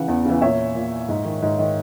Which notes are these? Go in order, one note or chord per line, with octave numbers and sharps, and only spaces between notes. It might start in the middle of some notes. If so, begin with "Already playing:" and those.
Already playing: C#3 E3 F#5
E2
C#3 E3
A#2 C#5 E5
A#2
G#2
D#3
G#2
D#3